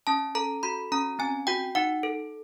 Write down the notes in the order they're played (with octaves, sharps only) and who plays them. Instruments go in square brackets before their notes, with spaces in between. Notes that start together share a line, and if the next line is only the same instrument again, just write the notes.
[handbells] C#4 A5
A4 A#5
F#4 B5
C#4 A#5
C4 G#5
F#4 G5
D#4 F#5
A4